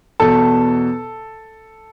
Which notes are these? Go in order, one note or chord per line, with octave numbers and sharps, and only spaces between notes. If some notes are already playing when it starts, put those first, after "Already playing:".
E2 B2 A4 A5